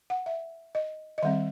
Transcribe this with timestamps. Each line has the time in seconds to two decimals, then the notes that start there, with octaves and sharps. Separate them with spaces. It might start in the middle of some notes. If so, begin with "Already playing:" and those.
0.10 F#5
0.26 E5
0.75 D#5
1.18 D#5
1.22 D#3 G3 C4 E5